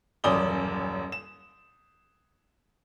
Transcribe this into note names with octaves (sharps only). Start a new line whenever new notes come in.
D#1 A1 F#2 D5 D#6 G7
E7